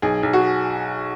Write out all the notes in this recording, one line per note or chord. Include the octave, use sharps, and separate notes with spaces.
B1 G#4
B1
F#4